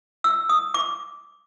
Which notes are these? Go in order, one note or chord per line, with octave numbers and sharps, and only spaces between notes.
E6
D#6
D6